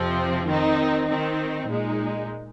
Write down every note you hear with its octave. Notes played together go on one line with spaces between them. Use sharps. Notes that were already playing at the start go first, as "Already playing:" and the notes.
Already playing: F2 C3 F3 C4
D#3 C4 D#4
D#3 C4 D#4
A#2 G#3 D#4